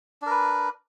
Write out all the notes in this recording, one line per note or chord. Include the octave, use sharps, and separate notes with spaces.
D4 A#4 B4